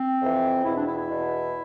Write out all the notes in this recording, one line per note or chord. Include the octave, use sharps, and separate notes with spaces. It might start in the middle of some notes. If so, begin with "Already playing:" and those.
Already playing: C4
F2 E3
E2 B2 E4
D4
E4
E4
E2 B2